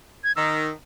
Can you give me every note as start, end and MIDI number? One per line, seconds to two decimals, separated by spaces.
0.24 0.32 92
0.36 0.69 51
0.36 0.71 88